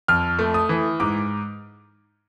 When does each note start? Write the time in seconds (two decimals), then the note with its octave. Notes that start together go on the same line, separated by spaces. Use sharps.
0.08 F2 F6
0.39 A3
0.54 D#6
0.69 E3
1.00 G#2 D6